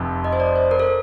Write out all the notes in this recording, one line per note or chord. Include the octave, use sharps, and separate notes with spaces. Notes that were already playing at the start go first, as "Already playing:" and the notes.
Already playing: F1 F2
D#5
C5
D5
C5
A#4
A4